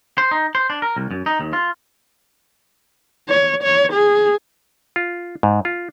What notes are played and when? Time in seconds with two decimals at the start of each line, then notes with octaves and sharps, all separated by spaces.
0.18 C5
0.31 D#4
0.55 C5
0.70 D4
0.82 A#4
0.96 C2
1.11 F#2
1.26 D#4
1.40 D#2
1.53 F4
3.29 C#5
3.63 C#5
3.92 G#4
4.96 F4
5.43 G#2
5.65 F4